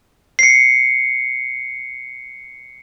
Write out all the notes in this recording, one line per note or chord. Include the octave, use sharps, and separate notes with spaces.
C7 C#7